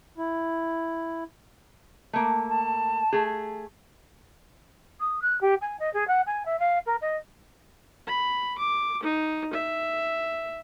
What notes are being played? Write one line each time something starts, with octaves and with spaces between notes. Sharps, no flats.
E4
A3 A#3
A5
A3 G#4
D#6
F#6
G4
G#5
D#5
G#4
F#5
G#5
E5
F5
A#4
D#5
B5
D6
D#4
E5